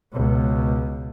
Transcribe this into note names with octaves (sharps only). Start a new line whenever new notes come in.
C#2 B2